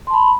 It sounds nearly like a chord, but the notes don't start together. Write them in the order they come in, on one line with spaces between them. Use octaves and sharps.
C6 A5 B5